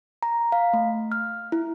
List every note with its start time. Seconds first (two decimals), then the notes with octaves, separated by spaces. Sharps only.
0.23 A#5
0.52 F5
0.73 A3
1.12 F6
1.52 E4